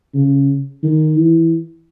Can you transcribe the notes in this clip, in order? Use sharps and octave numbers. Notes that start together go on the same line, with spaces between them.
C#3
D#3
E3